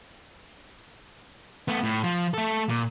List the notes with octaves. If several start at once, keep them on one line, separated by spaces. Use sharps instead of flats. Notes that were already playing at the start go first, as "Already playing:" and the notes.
A3 B3
A2
F3
A3 A4
A#2